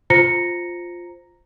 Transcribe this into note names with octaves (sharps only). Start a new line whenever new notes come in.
F4 C5 A#5 A#6 C#7